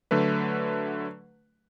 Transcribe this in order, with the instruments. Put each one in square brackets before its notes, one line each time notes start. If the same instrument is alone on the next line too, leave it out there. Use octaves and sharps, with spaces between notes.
[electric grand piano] D3 F#3 A3 B4